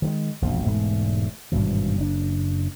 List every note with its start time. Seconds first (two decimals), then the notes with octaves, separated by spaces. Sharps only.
0.02 D#3 F3 G#3
0.42 E1 A#1 F#2 F3
0.65 E1 G#2 A3
1.52 G#1 G2 B2 E3
1.98 F#1 D4